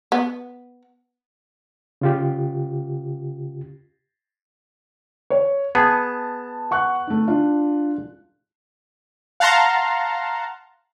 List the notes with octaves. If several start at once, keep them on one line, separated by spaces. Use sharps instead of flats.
B3
C#3 F4 G4
C#5
B3 G#4 A5
F#5 C#6 F#6
A3 D#4
D4 F4
F5 F#5 A5 A#5 C6